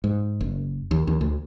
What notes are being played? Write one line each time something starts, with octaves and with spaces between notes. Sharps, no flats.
G#2
F#1
D#2
D#2
D2